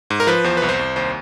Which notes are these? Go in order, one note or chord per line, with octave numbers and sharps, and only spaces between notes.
G#2
A#4
F3 B4
E2 C5
C2 B4
C5
C2
D#2 C5